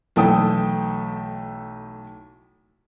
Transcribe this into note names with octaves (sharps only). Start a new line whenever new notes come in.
B1 E3 A3 A4 G5 D#6